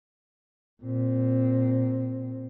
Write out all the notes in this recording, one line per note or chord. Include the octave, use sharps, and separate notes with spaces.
A#2 C4